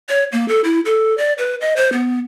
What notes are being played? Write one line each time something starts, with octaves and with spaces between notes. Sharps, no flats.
C#5
A#3
A4
E4
A4
D5
B4
D#5
C5
B3